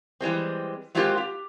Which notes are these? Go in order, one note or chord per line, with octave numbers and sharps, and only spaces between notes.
E3 G3 G#3 C4
F#3 G#3 A#3 C4 F4 G4
G4